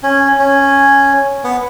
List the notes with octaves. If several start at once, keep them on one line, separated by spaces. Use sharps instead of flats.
C#4
C#4
B3